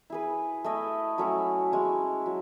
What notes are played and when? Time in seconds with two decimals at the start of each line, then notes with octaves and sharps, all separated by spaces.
0.10 E4 G#4 B4
0.64 A3 E4 B4 D#5
1.18 F#3 A3 C#4 E4
1.72 G#3 C#4 E4
2.26 F#3